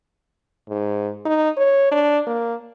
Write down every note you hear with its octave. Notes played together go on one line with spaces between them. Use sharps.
G#2
D#4
C#5
D4
A#3